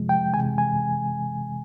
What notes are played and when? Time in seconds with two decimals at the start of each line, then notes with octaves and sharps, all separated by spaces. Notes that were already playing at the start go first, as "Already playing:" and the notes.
Already playing: C3 F3 G#3
0.09 G5
0.33 C3 E3 G#3 G#5
0.58 G#5